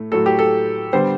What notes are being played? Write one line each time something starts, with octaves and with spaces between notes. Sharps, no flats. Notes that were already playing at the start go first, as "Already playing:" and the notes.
Already playing: A2 A3
A2 F#3 A3 A4
G4
A4
D3 G3 B3 C5